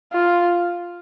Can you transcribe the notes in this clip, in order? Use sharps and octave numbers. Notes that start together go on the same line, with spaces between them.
F4